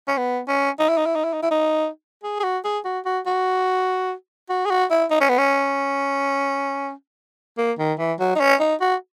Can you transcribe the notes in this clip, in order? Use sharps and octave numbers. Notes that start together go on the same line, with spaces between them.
C#4
B3
C#4
D#4
E4
D#4
E4
D#4
E4
D#4
E4
D#4
G#4
G#4
F#4
G#4
F#4
F#4
F#4
F#4
G#4
F#4
E4
D#4
C#4
B3
C#4
A#3
D#3
E3
F#3
D#4
C#4
D#4
F#4